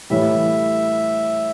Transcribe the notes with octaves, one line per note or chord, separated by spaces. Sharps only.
A2 E3 G3 E5